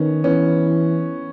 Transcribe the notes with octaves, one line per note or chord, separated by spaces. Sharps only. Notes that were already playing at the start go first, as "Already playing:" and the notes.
Already playing: D#3 B3 C#4
E3 B3 C#4